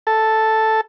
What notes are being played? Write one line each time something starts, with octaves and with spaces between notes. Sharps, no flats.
A4